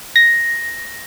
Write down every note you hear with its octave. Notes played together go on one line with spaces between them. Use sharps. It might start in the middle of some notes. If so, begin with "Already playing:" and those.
A#6